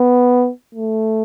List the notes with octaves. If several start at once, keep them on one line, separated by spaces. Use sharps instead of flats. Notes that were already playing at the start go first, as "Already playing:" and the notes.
Already playing: B3
A3